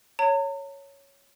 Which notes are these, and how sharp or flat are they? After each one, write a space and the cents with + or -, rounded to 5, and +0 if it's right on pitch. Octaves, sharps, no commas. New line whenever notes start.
C#5 +0 A#5 -40